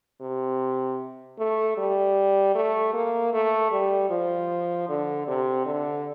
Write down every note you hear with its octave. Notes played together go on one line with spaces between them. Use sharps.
C3
A3
G3
A3
A#3
A3
G3
F3
D3
C3
D3